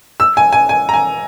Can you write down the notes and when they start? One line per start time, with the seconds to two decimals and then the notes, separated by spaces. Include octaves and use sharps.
0.20 E6
0.37 G#5
0.53 G#5
0.69 G#5
0.89 A#5
0.94 G#5